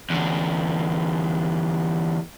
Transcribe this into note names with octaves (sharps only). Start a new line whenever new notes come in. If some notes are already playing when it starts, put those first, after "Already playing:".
E2 D3